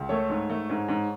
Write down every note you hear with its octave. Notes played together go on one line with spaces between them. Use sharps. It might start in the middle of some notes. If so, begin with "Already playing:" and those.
Already playing: C#2
A3 A4 C#5
G#2
A3
G#2
G#2